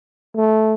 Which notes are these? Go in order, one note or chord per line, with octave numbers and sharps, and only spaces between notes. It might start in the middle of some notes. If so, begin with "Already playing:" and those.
A3